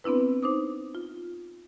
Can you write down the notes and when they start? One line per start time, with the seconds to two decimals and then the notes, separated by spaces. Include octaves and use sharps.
0.04 B3 C4 D4 E4 B4
0.42 D#4 C5 D6 D#6
0.95 F4